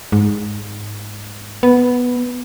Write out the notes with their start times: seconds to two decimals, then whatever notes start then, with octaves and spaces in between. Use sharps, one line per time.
0.12 G#2
1.63 B3